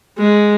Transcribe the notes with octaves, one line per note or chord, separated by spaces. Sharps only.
G#3